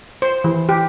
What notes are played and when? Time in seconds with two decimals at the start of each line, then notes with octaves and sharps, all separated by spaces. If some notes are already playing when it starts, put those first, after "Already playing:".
0.22 C5
0.44 E3
0.69 G4